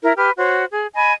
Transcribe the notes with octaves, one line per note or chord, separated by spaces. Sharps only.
E4 A#4
G4 B4 F6
F#4 C5 C#5
G#4
D#5 G#5 B5